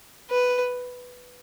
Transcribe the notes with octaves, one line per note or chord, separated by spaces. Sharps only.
B4